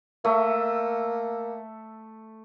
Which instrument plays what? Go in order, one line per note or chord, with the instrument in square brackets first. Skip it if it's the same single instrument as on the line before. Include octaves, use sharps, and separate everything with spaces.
[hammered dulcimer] A3 E5 [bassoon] A#3